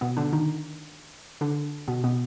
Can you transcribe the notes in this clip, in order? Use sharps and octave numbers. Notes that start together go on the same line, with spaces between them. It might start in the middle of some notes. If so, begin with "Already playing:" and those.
B2 B3
D3 D4
D#3 D#4
D3 D4
B2 B3
B2 B3